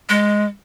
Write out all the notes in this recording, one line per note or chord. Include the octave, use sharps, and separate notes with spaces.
G#3